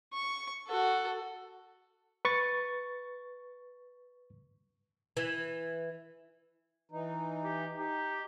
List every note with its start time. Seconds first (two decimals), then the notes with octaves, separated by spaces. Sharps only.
0.13 C#6
0.68 F#4 A4
2.25 B4 C#6 A6
5.17 E3
6.92 E3 D#4
7.44 G4
7.77 D#4 G4